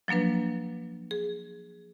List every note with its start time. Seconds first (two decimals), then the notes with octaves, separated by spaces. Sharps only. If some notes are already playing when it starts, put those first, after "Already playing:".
0.08 F3 F#3 A#3 D4 B4
1.11 G#4